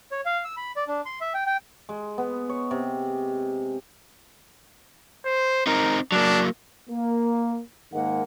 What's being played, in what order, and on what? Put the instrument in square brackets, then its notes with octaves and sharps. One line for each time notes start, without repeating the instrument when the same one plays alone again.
[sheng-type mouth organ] C#5
F5
E6
B5
D5
D4
C6
E5
G5
G5
[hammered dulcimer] G#3
B3
C#5
C3
[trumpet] C5
[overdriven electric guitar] C4 D#4 [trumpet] A#4
[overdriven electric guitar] F#3 A#3 [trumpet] D4
[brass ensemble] A#3
G#2 D#3 G#3 A#3 A#4 F#5